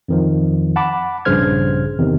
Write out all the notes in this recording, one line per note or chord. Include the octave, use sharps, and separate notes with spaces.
F2 D#3 F3
F#5 A5 B5 D6
A#1 G2 C#3 C5 F6 G#6
E2 C3 D#3